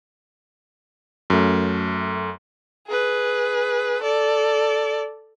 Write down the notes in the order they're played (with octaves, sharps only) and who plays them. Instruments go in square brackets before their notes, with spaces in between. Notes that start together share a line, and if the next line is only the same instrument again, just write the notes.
[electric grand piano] F#2 A3
[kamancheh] G#4 B4
A4 D5